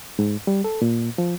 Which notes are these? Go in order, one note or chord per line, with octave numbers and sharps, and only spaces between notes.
G#2
G3
A4
A#2
F3